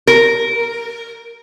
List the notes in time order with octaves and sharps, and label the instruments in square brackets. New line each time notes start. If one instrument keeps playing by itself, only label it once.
[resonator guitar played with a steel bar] A#4